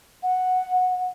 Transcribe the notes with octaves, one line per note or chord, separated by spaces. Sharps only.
F#5